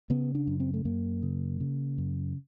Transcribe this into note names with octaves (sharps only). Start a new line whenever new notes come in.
C#3 B3
D4
F#2
C4
A3
F#2 A#3
C#3
C#3
F#2